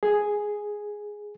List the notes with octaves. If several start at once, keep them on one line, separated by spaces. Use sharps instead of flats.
G#4